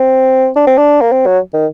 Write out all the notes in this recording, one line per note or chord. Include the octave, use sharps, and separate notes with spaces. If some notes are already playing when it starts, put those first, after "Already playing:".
Already playing: C4
D4
C4
D4
A#3
C4
F#3
D#3